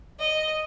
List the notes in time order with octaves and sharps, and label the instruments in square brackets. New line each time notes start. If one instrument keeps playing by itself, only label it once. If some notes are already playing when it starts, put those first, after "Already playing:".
[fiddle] D#5